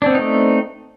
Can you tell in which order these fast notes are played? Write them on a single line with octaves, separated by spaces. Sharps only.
D4 C4 B3 D#4 A3